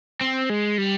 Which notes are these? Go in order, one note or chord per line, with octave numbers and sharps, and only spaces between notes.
C4
G#3
G3